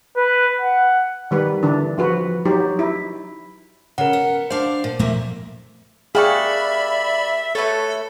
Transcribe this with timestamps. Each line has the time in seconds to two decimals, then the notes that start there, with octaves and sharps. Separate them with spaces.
0.16 B4
0.61 F#5
1.31 D#3 G3 B4
1.63 D3 E3 D4
1.98 F3 F#4 B4
2.45 F#3 D#4 G4
2.79 E4
3.98 C#3 A#4 F#5
4.13 B3
4.50 D4 C5 F5
4.84 A#2
4.99 A#2 F3 A3 A#3 E4
6.15 A#3 G4 G#4 D5 E5 B5 C#6 F#6
7.55 A3 A4 B4 C#5 A5